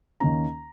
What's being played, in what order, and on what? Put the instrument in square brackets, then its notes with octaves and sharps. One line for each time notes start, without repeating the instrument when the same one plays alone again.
[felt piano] D#2 D#3 A#3 C#4 A#5